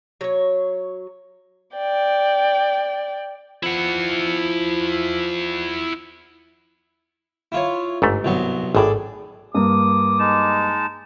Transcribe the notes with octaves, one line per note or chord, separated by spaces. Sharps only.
F#3 C#5
D5 G5
F3 E4 F#5
E4 F4 C#5
G1 G#2 A3
C2 F#3 B3
G#1 A2 G#4 A4 D5
G2 A#3 D6 D#6
G#3 D#4 A5